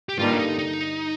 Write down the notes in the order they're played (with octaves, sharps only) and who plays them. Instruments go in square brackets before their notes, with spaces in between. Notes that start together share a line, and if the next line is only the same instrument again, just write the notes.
[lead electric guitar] G4
[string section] G2 D3 G3 A#3 D#4 [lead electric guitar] F4
[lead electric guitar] D4
D#4
D#4